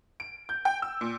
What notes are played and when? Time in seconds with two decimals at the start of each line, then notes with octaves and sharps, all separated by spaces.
0.20 D7
0.49 G6
0.65 G5
0.82 E6
1.01 A#2